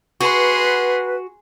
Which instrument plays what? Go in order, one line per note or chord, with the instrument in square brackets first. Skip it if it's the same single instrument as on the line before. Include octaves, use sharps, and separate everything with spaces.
[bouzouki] F#4 [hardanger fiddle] G#4 C6 [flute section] B4